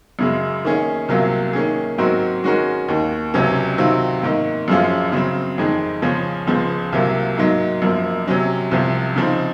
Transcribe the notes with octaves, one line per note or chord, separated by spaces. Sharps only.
F#2 C#3 G#3
D#3 A#3 C#4 G#4
C2 C3 F#3 A#3 F4
D#3 A#3 C#4 G#4
G#2 F#3 C4 F#4 A#4
D#3 G#3 C#4 F#4 A#4
D#2 D#3 A#3
C#2 C3 F#3 C#4
C3 D#3 F#3 C4 F4
G#2 D#3 A#3
F#2 F3 G#3 C#4 F4
C#3 F#3 C4
F2 D#3 G#3 D#4
C#3 F3 G#3 C#4
C#2 C#3 F3 G#3
C2 C3 F#3 A#3 F4
G#2 F#3 A#3 D#4
F#2 F3 A#3
C3 F#3 C#4
C2 C3 F3
C#3 F3 C4 D#4